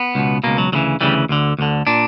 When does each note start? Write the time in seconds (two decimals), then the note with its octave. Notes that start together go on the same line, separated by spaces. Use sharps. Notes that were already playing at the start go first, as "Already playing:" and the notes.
Already playing: B3
0.15 C#2 B2
0.44 C#2 B2 A#3
0.58 F#3
0.72 D2 C#3 E3 F#3
1.01 D2 C#3 E3 G3
1.29 D2 D3
1.59 D2 D3
1.87 A#2 D4